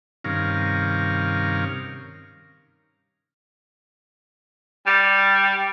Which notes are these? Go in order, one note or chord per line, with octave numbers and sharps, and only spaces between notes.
G2 C3 D#3 C#4 A#4 F5
G3